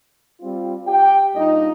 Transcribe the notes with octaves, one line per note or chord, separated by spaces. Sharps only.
G3 C4 F4
G4 G5
A#2 G3 D4 D#4 F4 D#5